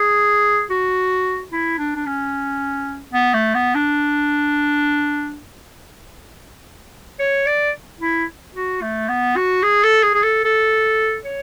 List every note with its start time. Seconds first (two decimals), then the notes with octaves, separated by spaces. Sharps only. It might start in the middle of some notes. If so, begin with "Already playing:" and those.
Already playing: G#4
0.70 F#4
1.52 E4
1.78 D4
1.96 D4
2.06 C#4
3.13 B3
3.34 A3
3.54 B3
3.75 D4
7.19 C#5
7.46 D5
8.00 E4
8.55 F#4
8.82 A3
9.08 B3
9.36 F#4
9.63 G#4
9.84 A4
10.03 G#4
10.14 G#4
10.23 A4
10.44 A4
11.25 C#5